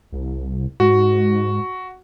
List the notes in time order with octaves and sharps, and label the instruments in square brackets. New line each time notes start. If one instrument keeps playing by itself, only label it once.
[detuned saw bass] C2
[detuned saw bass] G#2 [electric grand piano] F#4